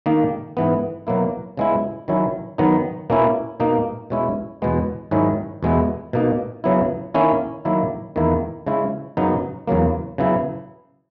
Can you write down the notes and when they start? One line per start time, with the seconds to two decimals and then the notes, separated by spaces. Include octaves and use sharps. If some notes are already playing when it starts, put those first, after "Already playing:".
0.06 D#3 A#3 D#4
0.57 G#2 E3 B3
1.07 B2 F#3 A#3 E4
1.57 C#3 G#3 B3 E4
2.08 D#3 F#3 C#4 E4
2.58 D#3 F#3 B3 D#4
3.10 B2 A#3 C#4 E4
3.60 B2 A#3 D#4
4.10 B2 G#3 C#4 E4
4.62 E2 B2 G#3 B3
5.11 G#2 D#3 F#3 C#4 E4
5.63 E2 B2 G#3 B3 E4
6.13 B2 A#3 D#4
6.64 C#3 F#3 B3 E4
7.14 D#3 A#3 C#4 E4
7.65 D#3 F#3 A#3 E4
8.16 E2 D#3 A#3 E4
8.67 C#3 G#3 C#4 E4
9.17 F#2 C#3 F#3 B3 D#4
9.68 E2 C#3 F#3 A#3
10.18 C#3 F#3 B3 E4